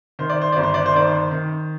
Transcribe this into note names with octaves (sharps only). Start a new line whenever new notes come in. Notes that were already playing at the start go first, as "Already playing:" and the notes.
D#3 C5
D5
C5
G1 D5
C5
D5
C5
D#3 D5
C5
D#3